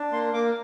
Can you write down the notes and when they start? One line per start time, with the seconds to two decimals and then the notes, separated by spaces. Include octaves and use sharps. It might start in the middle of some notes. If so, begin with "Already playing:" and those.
Already playing: D4
0.12 A#3 C6
0.33 A#3 D6